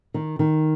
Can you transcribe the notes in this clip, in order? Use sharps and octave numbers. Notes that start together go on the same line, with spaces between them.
D#3
D#3